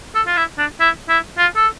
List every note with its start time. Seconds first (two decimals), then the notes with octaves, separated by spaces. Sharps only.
0.15 A4
0.26 F4
0.37 E4
0.58 D4
0.80 E4
1.09 E4
1.37 F4
1.56 A4